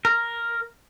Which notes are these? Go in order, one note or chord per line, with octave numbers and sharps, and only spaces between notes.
A#4